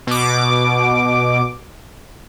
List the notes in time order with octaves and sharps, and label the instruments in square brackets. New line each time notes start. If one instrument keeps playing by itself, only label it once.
[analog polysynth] B2 D6